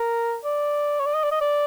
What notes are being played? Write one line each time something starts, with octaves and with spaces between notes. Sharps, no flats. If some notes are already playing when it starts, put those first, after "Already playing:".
Already playing: A#4
D5
C#5
D5
D#5
D5
D#5
D5